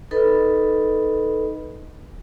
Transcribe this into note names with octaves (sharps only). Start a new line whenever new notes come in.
D#4 A4 B4 D#5 B5